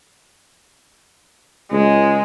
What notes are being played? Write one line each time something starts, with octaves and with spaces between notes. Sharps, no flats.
C#2 G#3